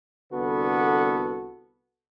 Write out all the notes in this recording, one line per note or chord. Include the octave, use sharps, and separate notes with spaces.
C2 D3 B3 F#4 A4 B4